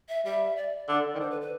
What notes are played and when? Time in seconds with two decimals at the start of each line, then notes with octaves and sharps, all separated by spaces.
0.09 E5
0.25 G3 E5
0.56 D5
0.88 D3
1.15 D#3
1.19 D3 C5
1.30 B4
1.41 B4